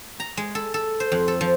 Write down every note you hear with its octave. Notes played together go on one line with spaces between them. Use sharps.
A#5
G#3
A4
A4
C5
F2
A4
F3